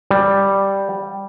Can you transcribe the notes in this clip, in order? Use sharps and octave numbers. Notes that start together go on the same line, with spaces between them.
G3